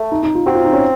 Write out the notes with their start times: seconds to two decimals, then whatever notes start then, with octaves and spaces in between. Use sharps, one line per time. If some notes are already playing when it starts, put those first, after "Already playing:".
Already playing: A3
0.11 D#4
0.23 D#4
0.35 F4
0.46 C4 F#4
0.55 F4
0.65 D#4
0.73 C#4